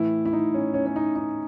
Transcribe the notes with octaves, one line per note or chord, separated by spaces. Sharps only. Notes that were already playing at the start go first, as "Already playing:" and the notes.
Already playing: A2 E3 E4
E4
D#4
C#4
C#4
C#4
D#4
D#4